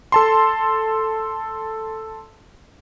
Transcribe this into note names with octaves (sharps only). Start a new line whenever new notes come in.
A4 A5 C6